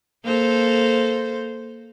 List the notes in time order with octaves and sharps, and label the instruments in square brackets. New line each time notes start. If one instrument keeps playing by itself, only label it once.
[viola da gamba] A#3 A4 C5